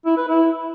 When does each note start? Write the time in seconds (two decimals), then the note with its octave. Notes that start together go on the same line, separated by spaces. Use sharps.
0.06 E4
0.17 B4
0.28 E4